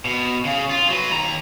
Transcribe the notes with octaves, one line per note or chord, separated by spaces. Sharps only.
B2
C#3
F4
F#3 B4
D#2 A#5